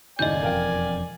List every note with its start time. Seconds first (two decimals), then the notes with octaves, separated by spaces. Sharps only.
0.19 F#1 D#2 A2 D5 D#5 G#5 G6
0.43 E1 F2 A#4 F5 G5